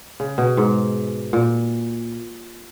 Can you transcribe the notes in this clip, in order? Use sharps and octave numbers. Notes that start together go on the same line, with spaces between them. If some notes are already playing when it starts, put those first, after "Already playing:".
C#3
B2
G#2
A#2